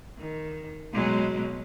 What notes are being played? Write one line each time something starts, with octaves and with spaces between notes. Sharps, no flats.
D#3
B2 F#3 G#3